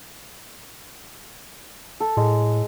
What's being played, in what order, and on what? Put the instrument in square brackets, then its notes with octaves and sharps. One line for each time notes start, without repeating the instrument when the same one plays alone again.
[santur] A4
[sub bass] A2 [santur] G#3